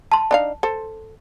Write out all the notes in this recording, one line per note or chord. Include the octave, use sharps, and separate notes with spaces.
A5 C6
D4 D#4 F5
A4 C5